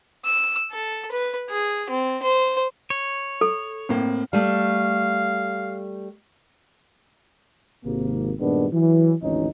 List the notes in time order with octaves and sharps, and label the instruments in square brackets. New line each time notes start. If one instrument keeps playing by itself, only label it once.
[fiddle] E6
A4
B4
G#4
C4
C5
[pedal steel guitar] C#5
[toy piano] A4
[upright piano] A2 A#3 [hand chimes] C4
[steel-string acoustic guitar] G3 A3 [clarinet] F5
[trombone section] G#1 C3 A#3
G2 A#2 D#3 G#3 B3 D4
E3 F#3
G#1 D2 E3 C#4 D#4